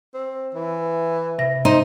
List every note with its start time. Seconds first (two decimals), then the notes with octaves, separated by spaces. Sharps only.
0.14 C4
0.54 E3
1.39 C3 E5 A#6
1.65 D#4 C5